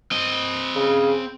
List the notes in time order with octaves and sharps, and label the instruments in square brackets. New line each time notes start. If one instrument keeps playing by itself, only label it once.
[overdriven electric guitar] C4 D#5
[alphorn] C#3